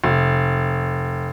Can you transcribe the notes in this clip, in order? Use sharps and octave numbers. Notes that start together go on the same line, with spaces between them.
F1